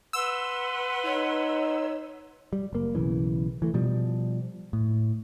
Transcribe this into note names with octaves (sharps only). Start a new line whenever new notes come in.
B4 F#5 C6 E6
D#4 C#5
G3
F#1 A#3
B1 C#3 E3
E3 A3
B2 F3 G3
A2